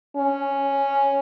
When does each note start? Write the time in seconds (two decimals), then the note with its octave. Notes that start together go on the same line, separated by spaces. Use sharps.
0.17 C#4